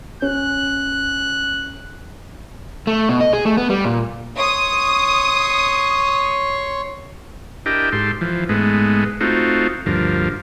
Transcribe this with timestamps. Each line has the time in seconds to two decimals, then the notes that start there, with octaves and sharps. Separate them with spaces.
0.22 C#4 F#6
2.87 A3
3.09 B2
3.21 D#5
3.33 G#4
3.46 A3
3.57 B3
3.70 G3
3.85 A#2
4.38 C#5 C6 C#6 D#6
7.66 D4 E4 G4 A#4 D#5 G5
7.92 G#2 G4 A4 C6
8.21 E3 F3
8.49 G#2 G#3 A3 B3
9.21 A3 C4 D#4 F4 F#4
9.86 D2 G2 F3 A#4